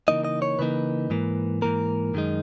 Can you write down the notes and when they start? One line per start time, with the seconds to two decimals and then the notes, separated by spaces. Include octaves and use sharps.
0.08 C#3 E3 A#3 D#4 D#5
0.25 D#5
0.42 C#5
0.59 C#3 E3 A#3 D#4 B4
1.10 G#2 E3 A#3
1.62 G#2 E3 A#3 A#4
2.14 F#2 D#3 G#3 D#4